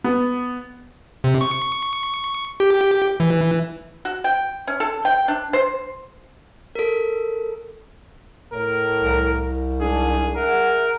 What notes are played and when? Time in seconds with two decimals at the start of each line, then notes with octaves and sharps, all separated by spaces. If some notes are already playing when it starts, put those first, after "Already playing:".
0.04 B3
1.24 C3
1.41 C#6
2.60 G4
3.20 E3
4.05 F#4
4.24 G5
4.67 C#4
4.80 A4
5.05 G5
5.28 D4
5.53 C5
6.75 A4 A#4
8.54 A2 A#4
9.01 C2
9.81 G#2 D4 G#4
10.36 G#4 A#4 E5 F#5